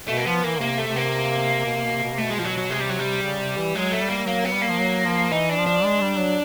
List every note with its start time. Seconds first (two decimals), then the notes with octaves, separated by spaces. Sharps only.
0.08 B2 A3
0.17 A#3
0.26 F3 B3
0.44 E3 A#3
0.61 C3 A#3
0.78 A3
0.87 C3
0.96 A#3
1.66 B2
1.75 C3
1.85 B2
1.94 C3
2.03 B2
2.12 C3
2.18 B2 A3
2.30 G#3
2.38 F3
2.44 F#3
2.57 F#3
2.70 C3 G#3
2.80 G3
2.89 F#3
2.99 G3
3.23 C#3
3.40 C3
3.58 E3
3.75 F#3 G#3
3.92 A3
4.01 G3
4.10 A#3
4.27 F#3 A#3
4.45 B3
4.53 G3
4.62 A#3
4.70 F3
4.79 F#3
5.05 F3
5.31 E3 D#4
5.49 D4
5.58 F3
5.67 D4
5.84 G#3
6.01 G3
6.19 F#3